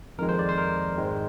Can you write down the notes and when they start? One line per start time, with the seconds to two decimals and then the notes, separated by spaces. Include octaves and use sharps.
0.18 F2 D#3 G#3 A#4
0.29 C5
0.39 D5
0.49 C5
0.58 A#4
0.98 G#2 D#3 G#3